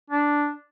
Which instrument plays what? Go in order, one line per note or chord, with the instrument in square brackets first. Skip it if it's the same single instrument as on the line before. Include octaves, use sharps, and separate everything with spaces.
[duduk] D4